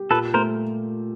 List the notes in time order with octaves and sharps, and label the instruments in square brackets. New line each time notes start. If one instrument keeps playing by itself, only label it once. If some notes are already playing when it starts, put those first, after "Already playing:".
Already playing: [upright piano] G4
[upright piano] A#2 [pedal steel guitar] A4 B4
[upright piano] A3 [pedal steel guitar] A#4 C5